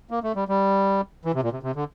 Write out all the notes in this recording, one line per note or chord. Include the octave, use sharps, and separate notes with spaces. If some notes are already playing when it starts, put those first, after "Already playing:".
A#3
A3
G3
G3
E3
C3
A#2
C3
C3
D3